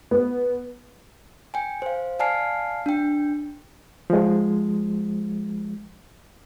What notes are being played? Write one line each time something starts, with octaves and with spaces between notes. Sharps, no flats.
B3
G5 G#5
C5 F5
D5 F5 G#5 A5 F6 C7
D4 G5
F3 G#3